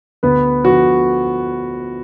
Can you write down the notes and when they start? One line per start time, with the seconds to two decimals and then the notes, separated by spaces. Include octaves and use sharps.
0.23 D2 B3 B4
0.65 D3 F3 F#4